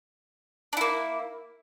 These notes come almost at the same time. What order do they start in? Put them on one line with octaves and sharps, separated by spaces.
D4 E4 A#3